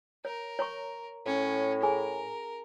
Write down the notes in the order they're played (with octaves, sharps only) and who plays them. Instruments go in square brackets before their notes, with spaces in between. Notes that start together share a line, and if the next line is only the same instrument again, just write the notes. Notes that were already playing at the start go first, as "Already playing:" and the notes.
[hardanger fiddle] A#4 [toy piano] C#5
[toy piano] C#5 A#5 C#6
[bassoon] A2 [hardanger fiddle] C#4
[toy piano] G#4 G#5 [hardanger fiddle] A#4